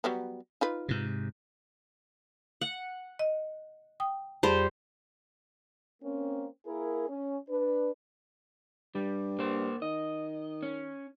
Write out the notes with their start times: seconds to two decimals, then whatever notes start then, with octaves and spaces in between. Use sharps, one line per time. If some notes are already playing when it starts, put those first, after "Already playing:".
0.04 F#3 G3 B3
0.61 D#4 F4 B4
0.88 G#2 C3
2.61 F#5
3.19 D#5
4.00 G5 D#6
4.43 F2 G3 G#4 C5 B5 C6
6.02 A#3 C4 C#4
6.66 A#3 E4 G#4 A#4
7.09 C#4
7.48 D4 B4
8.95 G2 G3
9.39 A#3 C5
9.82 D#3 D#5
10.63 C#4